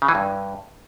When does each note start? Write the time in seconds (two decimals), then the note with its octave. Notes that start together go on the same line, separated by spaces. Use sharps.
0.02 C#3
0.08 E3
0.15 G2